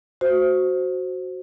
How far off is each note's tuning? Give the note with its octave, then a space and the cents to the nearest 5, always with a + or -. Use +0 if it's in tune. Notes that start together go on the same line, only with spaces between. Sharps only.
F#4 +0 C5 +0